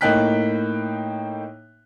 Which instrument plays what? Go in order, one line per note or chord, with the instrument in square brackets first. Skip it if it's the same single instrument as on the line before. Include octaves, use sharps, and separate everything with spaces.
[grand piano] A2 A#3 D#4 G5 F#6 B6